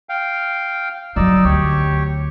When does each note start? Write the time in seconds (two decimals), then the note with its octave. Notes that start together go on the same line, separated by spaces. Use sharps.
0.09 F5 G5
1.16 F3 F#3 D#4 D5 E6
1.44 D2 G4 C#5